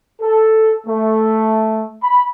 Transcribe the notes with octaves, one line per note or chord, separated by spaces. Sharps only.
A4
A3
B5